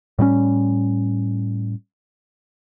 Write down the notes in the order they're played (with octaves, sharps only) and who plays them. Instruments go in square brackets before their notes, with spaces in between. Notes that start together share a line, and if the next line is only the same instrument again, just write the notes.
[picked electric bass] A2 G3 A#3 C#4